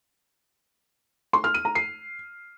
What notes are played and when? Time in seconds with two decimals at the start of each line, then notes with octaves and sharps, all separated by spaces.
1.33 C6
1.44 F6
1.54 D#7
1.65 A#5
1.75 C7